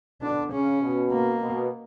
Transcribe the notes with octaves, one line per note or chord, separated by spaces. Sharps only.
B2 D3 D4
C#3 C#4
B2
A#3
B2